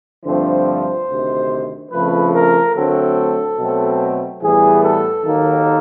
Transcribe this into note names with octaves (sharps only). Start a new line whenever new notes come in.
G2 D3 F3 A3 C4 C5
D2 C3 D#3
F2 C#3 F3 A3 B4
A#4
D2 D3 F#3 A3 C4 A4
B2 F#3 A3 C4
A2 E3 G3 B3 G#4
A4
D#2 D#3 F#3 A#3